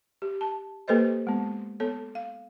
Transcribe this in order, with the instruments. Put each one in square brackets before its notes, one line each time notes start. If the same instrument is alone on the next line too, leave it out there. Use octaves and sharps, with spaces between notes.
[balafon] G4
A5
A#3 G4 A4 B4 C5 D#5
G#3 B3
B3 A4 C#5
F5